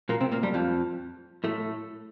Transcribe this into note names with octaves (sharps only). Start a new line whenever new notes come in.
A#2 A#3
C3 C4
A#2 A#3
G2 G3
F2 F3
A2 A3